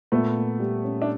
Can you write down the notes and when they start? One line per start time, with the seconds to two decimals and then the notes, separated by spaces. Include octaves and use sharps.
0.12 A#2 A3 B3
0.36 A#3
0.59 G3
0.84 C#4
1.02 D4